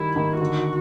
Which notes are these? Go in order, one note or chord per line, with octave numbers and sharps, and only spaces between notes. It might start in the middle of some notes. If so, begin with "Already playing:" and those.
Already playing: D#3 G3 E4
D#3
D3 F#4